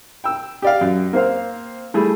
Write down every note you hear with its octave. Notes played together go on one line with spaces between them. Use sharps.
G5 E6
G4 D5 F5
F#2
A#3 C4 C5 F5
G3 A3 E4 G#4